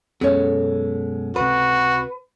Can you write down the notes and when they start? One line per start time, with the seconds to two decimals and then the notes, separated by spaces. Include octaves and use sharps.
0.21 B1 F#2 B2 G#3 C#4 A4 C#5
1.36 C#2 C3 F#4 B4